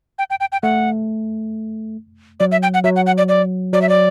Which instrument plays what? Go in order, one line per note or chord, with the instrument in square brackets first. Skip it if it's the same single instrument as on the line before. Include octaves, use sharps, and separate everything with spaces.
[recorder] G5
G5
G5
G5
[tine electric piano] A3 [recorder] F#5
[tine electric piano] F#3 [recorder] D5
[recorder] E5
G5
F#5
[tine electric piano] F#3 [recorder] E5
[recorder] F#5
F#5
D5
D5
[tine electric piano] F#3 [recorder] D5
[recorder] E5
D5